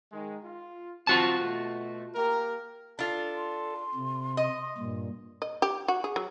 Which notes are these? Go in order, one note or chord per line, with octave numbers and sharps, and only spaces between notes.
D#3 G#3
F4
C4 F4 F#4 A5
B2 A3
A#3 G4 A#4
D4 F4 A4
C6
C3
D#5
G2 A#2
D#5
G4
F#4
G#4
F#3